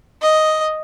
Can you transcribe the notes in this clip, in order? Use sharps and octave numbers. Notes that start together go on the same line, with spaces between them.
D#5